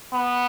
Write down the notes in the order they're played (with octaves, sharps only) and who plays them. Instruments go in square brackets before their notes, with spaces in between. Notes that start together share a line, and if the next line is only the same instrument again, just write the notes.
[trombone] B3